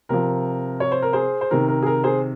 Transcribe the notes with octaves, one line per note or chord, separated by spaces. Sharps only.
C3 F3 A#4
C#5
C5
A#4
G#4 C5
C5
C3 D#3 A#4
A#4
G#4
A#4
G#4 C5